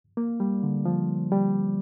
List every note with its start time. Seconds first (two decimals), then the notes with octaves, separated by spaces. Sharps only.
0.17 A#3
0.40 G3
0.63 D3
0.85 F3
1.32 G3